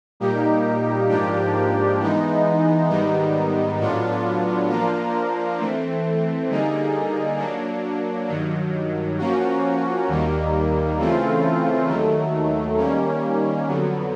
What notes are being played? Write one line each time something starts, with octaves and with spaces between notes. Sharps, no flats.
A#2 G3 A#3 D#4 G4
G#2 F3 A#3 D4 G4
E3 G#3 B3 D#4
G#2 D#3 G3 B3 D#4
A2 F#3 B3 D4 F4
F3 A#3 D4 F4 A#4
E3 A3 C4
D3 G3 A#3 D#4 G#4
F#3 A#3 D4
G2 D#3 F#3
F3 A#3 C#4 F#4
D#2 D#3 G3 A#3
C#3 E3 A3 C4 F4
D#2 D#3 F#3 A3
D#3 G3 A#3 C#4
F2 D3 F#3 B3